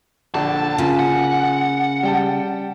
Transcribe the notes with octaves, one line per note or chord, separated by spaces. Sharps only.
A#1 D3 D4 A5
C#3 A#3 F4
F#5
G3 G5 A5